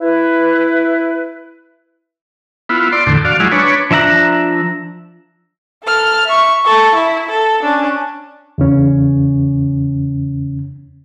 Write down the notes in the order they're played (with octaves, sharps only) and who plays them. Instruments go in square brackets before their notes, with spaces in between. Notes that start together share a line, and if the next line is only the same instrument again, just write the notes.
[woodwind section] E4 B4
[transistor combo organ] B3 E4 F4
D5 C6
E2 A2 D3
F#4 D5 F5
F#3 G#3 E4 F4
D4 B4 C#5
[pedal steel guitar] F3 D4 E5 A#5 F#6
[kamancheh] A4 F6
E5 C#6
A4 C#6
E4
A4
C#4 D4
[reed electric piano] E2 C#3 C#4